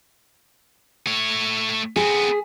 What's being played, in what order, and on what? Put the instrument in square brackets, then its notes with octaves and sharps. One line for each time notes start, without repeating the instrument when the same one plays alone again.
[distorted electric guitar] A3 C#5
[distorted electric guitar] B3 C4 [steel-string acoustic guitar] G#4